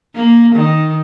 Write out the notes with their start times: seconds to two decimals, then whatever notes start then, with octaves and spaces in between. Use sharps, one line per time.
0.15 A#3
0.55 D#3